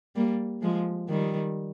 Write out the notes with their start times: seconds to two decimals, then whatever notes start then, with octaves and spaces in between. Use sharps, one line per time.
0.16 G3 A#3
0.62 F3 G#3
1.09 D#3 G3